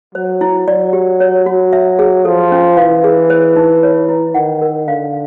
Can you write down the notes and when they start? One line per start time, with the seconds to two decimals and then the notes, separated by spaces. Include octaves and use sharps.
0.14 F#3 C5
0.41 E4
0.68 F#3 D5
0.93 G4
1.20 C#5
1.46 F#4
1.73 E5
1.99 G#4
2.24 F3 A4
2.52 C#4
2.77 E3 F5
3.04 G#4
3.30 C5
3.56 D#4
3.83 C#5
4.09 E4
4.35 D#3 F#5
4.61 A#4
4.87 D3 F5